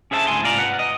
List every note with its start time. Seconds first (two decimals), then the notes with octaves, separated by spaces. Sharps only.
0.11 C#4 G#4 C5 E5 A5
0.27 D2 A2 G#5 C6
0.43 G#2 C3 F4 D5 A#5
0.58 B4 F#5
0.79 D#5